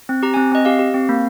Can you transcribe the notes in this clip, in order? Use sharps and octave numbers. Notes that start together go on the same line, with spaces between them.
C4
G4 A#5
C4 G#5
C4 D#5
G4 F5
G4
C4
A#3